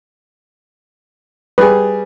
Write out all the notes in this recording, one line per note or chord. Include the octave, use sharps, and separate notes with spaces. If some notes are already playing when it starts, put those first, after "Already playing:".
G3 G#4 B4